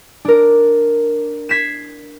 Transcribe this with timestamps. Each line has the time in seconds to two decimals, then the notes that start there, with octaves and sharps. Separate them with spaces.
0.25 D4 A#4
1.49 G#6 B6 C7 E7